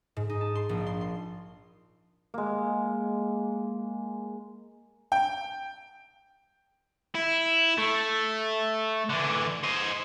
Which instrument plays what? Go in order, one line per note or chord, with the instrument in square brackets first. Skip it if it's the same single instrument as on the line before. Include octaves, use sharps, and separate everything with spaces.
[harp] G#2
D#4
A5
C6
A#1
C6
C6
[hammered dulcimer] G#3 A#3
[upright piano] G5
[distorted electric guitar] E4
A3
D3 E3
C5 D#5